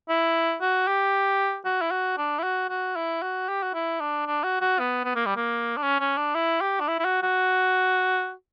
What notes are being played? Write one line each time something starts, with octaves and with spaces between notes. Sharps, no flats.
E4
F#4
G4
F#4
E4
F#4
D4
E4
F#4
F#4
E4
F#4
G4
F#4
E4
D4
D4
F#4
F#4
B3
B3
A#3
G3
A#3
D4
C#4
C#4
D4
E4
G4
D4
E4
E4
F#4
F#4